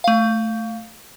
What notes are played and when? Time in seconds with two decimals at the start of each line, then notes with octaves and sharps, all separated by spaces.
0.04 A3 F5